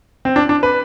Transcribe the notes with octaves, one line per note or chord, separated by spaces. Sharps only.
C4
D4
D4
B4